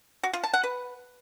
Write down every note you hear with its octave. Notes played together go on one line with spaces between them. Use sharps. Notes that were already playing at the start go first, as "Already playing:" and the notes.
F#4
F4
A5
F#5
B4